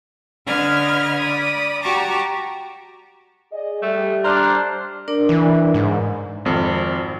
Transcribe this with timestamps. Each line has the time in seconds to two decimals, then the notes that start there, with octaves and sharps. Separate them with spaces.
0.45 D3 B4 D#5 F6 G#6
1.19 D5 B5 D#6
1.82 F#4 G4 A5 A#5 C#6 D6
3.53 G#4 D5 D#5
3.82 G3 A3
4.24 D4 C5 A#5 F6 F#6
5.08 D4 A#4 D5
5.29 E3
5.74 G#2
6.45 G#1 F2